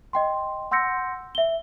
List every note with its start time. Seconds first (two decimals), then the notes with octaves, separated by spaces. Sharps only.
0.13 D#5 G5 C6
0.71 F#5 C6 E6 G6 A#6 C#7
1.35 E5 G7